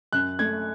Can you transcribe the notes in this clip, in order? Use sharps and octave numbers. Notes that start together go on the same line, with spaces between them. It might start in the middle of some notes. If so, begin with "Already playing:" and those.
F#2 F#6
A3 G#6